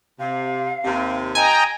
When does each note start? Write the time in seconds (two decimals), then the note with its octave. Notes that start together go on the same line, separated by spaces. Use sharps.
0.20 C3 F5
0.85 D#2 C3
1.35 D#5 G5 G#5 A#5